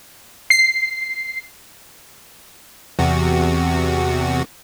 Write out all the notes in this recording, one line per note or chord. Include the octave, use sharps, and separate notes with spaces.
C7
E2 C3 F#4